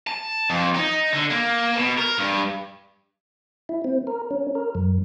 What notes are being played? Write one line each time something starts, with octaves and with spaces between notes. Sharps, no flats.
A5
F2
D#4
D3
A#3
B2
A#4
G2
E4
C4
A#4
C#4
A#4
F#2